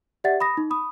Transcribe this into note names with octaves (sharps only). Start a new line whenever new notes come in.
G4 D5 E5 F#5 A6
B5 D#6 A#6
D#4
B5 D#6